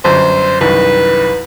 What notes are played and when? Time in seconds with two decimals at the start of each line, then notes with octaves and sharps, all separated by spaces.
0.04 G1 F#2 C5
0.61 C2 F#2 D#3 B4